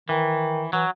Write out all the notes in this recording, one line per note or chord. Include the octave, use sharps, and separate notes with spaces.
D#3 E3
E3 F#3